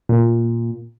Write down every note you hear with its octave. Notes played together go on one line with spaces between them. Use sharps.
A#2